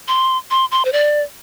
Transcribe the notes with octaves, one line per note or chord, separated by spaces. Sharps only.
C6
C6
C6
C5
D5